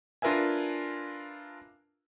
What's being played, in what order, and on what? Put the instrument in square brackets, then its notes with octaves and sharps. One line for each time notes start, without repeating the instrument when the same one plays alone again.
[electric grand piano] D4 F4 A#4 B4 E5 G#5